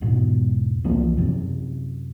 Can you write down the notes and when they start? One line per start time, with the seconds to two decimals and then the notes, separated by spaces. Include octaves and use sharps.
0.01 E1 G#2 B2
0.84 C2 E3 F3 A#3
1.17 F#2 C3